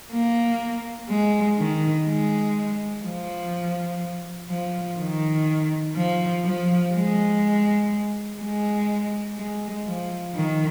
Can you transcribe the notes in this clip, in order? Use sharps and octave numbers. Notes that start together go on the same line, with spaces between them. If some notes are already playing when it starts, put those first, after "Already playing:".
A#3
G#3
D#3
G#3
F3
F3
D#3
F3
F3
G#3
G#3
G#3
F3
D#3